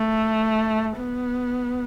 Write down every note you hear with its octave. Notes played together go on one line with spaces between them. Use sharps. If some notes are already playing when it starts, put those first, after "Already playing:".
Already playing: A3
B3